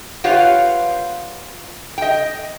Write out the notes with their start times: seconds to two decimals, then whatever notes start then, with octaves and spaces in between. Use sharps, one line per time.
0.24 F4 G4 B4 C#5 F5 F#5
1.98 D#5 G5